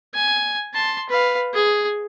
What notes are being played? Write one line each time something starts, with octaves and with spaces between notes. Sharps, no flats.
G#5
A5 C6
B4 F5
G#4